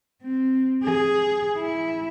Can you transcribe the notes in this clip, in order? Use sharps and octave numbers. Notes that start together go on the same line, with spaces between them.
C4
G#4
E4